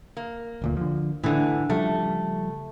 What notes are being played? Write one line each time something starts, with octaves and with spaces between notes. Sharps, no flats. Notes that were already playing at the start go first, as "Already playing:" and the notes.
A#3
D#1 D2 A#2
D3 F3
A2 D3 E3
C#3 F3 G3 A3